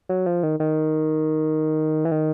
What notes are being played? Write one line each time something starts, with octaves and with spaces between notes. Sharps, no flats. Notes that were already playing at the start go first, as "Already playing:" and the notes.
F#3
F3
D#3
D#3
E3
D#3